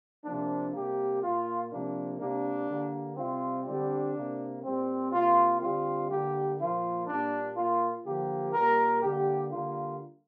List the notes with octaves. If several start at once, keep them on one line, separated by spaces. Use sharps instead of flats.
C3 F3 A#3 D4
C3 G3 A#3 G4
A#2 A#3 F4
C3 F3 A#3 D4
C3 G3 A#3 D4
D3 G3 A#3
C3 G3 C4 F4
D3 G3 C4 D4
C3 A#3
A#2 G3 C4
C3 A#3 F4
D3 G3 C4 F4
D3 G3 A#3 G4
A#2 F3 A#3 F4
A#2 G3 A#3 D4
A#2 A#3 F4
D3 F3 A#3 G4
A#2 G3 A#3 A#4
D3 G3 A#3 G4
D3 G3 A#3 F4